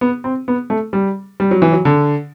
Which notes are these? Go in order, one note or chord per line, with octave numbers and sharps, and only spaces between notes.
B3
C4
B3
A3
G3
G3
F#3
E3
F#3
D3